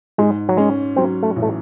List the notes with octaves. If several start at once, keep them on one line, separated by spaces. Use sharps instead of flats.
G#2 G#3
F#3
G#3 C#4
F#3 C4
A3
A1
A3